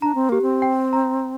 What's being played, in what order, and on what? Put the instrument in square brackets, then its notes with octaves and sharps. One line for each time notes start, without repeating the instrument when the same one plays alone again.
[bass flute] D4 [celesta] A#5
[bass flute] C4
[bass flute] A#3 [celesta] G4
[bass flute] C4
[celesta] G5
A#5